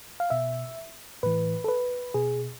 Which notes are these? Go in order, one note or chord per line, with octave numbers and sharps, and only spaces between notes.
F5
B2 E5
A2 E3 B4
A4
B4
B2 G#4